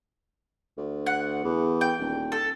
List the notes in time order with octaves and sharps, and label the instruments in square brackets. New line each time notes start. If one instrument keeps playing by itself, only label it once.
[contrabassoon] D2
[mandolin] F#5
[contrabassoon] E2
[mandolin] G5
[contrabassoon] D#1
[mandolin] A4